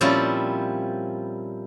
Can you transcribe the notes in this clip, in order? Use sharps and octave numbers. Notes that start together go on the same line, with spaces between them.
A#2 F3 G3 C4 C#4 E4